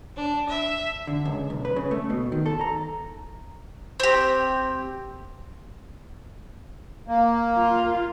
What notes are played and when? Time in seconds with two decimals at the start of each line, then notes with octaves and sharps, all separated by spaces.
0.16 D4
0.48 E5
1.07 D3
1.25 C#2
1.50 B1
1.65 B4
1.76 C#3
1.91 A3
2.10 B2
2.32 D#3
2.46 A4
2.61 A#5
4.00 C4 G4
7.08 A#3
7.56 F4